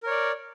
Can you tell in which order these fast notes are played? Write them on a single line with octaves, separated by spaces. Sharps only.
A#4 C#5 D5